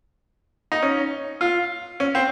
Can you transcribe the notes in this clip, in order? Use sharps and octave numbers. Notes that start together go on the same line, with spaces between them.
D#4
C#4
F4
C#4
C4